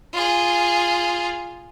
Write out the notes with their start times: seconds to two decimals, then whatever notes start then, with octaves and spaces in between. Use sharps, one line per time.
0.13 F4 G#4